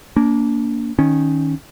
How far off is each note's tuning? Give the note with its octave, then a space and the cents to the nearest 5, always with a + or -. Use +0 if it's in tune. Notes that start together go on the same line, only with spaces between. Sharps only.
A#3 +0 D4 -35
D#3 +0 C#4 +0